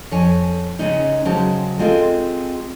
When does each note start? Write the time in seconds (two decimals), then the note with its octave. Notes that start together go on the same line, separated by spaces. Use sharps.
0.11 F2 C#5 G#5
0.79 C#3 G#3 C#4 D#4
1.25 C#3 F#3 G#3 C5 A5
1.79 G#3 C4 F4 G#4 A4